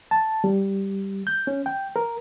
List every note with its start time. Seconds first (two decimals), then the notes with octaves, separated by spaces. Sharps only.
0.11 A5
0.44 G3
1.27 G6
1.47 C#4
1.66 G5
1.96 A#4